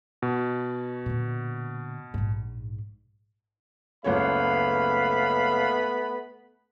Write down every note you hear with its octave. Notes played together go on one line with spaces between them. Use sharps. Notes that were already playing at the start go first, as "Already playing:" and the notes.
B2
A#2 D3
A#1 G#2
F#1 C#2 A3 B3 C#5 F5 B5